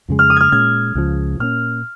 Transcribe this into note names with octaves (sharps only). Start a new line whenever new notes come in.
F2 C#3 G#3
F6
D#6
F6 G#6
A#2 G#3 C#4 G#6
C#2 C#3 F3
A#2 A#3 C#4 F6